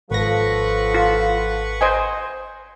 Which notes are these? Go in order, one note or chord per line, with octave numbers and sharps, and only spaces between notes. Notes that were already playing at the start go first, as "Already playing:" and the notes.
G#1 F3 A4 B4 F#5 C#6 A#6
F4
C5 D#5 G#5